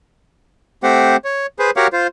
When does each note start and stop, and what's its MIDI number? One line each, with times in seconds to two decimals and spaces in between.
0.83 1.16 57
0.83 1.16 60
0.83 1.16 67
0.83 1.16 72
0.83 1.16 78
1.24 1.46 73
1.59 1.71 68
1.59 1.71 71
1.59 1.71 72
1.77 1.87 66
1.77 1.87 67
1.77 1.87 70
1.77 1.87 73
1.77 1.87 77
1.77 1.87 78
1.93 2.07 65
1.93 2.07 72